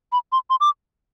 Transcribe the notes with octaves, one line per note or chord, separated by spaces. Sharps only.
B5
C6
C6
D6